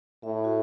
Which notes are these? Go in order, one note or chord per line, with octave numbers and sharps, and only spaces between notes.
A2 E5
F#4